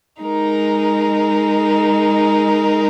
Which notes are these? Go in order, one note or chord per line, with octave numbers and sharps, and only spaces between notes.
G#3 D#4 A#4